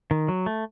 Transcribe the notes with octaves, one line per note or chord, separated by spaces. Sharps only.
D#3
F#3
A3